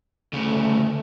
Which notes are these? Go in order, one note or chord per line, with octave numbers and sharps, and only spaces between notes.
D2 C#3 A3